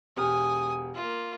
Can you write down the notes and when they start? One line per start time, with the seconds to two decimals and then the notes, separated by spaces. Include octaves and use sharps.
0.17 E1 G4 G#5 D#6 F6
0.95 A#3 F4